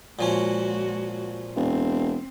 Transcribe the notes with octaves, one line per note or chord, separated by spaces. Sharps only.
A#2 F3 G#3 C#4 F#4
E1 C4